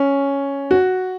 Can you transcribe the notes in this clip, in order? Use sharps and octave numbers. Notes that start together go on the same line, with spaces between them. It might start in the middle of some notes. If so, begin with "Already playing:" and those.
Already playing: C#4
F#4